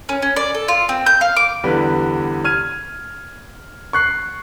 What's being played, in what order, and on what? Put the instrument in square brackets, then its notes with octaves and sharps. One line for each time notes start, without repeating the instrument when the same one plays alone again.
[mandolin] C#4
C#4
D5
A4
F4
C4
G6
F5
D6
[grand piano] E2 D3 G3 B4
F6 G#6 D#7
C#6 F#6 C7